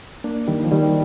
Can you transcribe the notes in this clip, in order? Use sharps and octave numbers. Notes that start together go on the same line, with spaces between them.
A#3 D4
D#3 G3
F3
D#3 G3